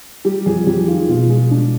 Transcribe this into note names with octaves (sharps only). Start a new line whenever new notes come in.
G3 G4
F2 G#4
F2 G4
D#3 F4
B2 F4
G#3
G#3 D4